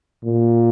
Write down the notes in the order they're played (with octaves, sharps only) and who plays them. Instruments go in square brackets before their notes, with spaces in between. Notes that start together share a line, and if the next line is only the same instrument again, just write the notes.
[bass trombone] A#2